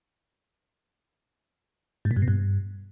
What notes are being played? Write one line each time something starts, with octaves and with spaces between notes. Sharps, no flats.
G#2
A#2
G2
B2
G2